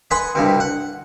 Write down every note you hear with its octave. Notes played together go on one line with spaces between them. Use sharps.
B4 D#5 F#5 G#5 B5 C6
C2 G2 B2
F#5